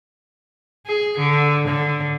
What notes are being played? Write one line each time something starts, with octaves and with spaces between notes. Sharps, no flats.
G#4
D3
D3